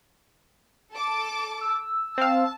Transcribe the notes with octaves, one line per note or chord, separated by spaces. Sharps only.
A4 A5 D6
E6
C4 F5 A5